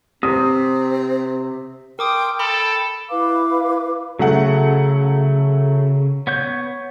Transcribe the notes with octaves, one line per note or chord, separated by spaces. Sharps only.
C3 C4 D#6
A#4 G5 C6 D6 D#6
A4 G5 B5
E4 B4 F5 D6
C#3 F#3 A3 F#5
B3 C#5 G6